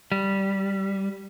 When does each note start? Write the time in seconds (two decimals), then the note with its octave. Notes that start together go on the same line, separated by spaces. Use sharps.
0.12 G3